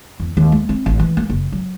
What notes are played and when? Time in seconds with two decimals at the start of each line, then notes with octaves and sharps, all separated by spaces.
0.20 E2
0.37 D#2
0.52 A3
0.69 C4
0.86 A1
1.00 E3
1.17 A#3
1.30 F#1
1.52 F#3